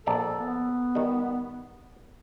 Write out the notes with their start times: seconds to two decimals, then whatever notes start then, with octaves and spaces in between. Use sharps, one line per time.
0.06 A#1 A4 D5 A#5
0.39 B3
0.95 D#3 G3